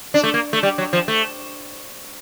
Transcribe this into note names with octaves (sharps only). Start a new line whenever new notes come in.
D4
A3
A#3
A3
G3
F#3
F3
A3